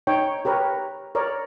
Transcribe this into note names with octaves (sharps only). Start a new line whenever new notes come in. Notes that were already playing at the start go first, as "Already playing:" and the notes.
D#4 C#5 G5
G4 A#4 B4 C#5
A#4 C#5 D5